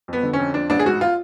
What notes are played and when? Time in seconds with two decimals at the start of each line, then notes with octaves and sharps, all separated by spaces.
0.08 F2 B3
0.23 D3
0.33 C#4
0.40 F2
0.54 F3 D4
0.70 A1 D4
0.79 G#4
0.86 G#2 F#4
1.01 F4